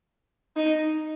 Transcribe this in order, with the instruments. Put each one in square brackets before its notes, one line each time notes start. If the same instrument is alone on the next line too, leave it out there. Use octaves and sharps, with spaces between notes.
[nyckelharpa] D#4